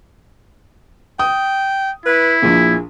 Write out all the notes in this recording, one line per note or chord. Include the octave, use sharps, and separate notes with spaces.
G5 D#6
E4 B4
A#1 A#2 G#4